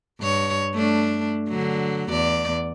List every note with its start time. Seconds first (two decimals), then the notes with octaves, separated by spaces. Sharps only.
0.21 G2 C#5
0.74 A3 D4
1.49 D3 F#3
2.10 E2 D5